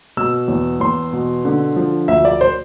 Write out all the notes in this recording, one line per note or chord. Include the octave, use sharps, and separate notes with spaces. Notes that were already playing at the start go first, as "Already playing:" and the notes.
B2 E6
E2
E2 C6
B2
D3
F3
D2 E5
D5
C5